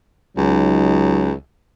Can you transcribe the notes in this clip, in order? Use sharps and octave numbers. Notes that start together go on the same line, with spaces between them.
C#2 F#3 D#4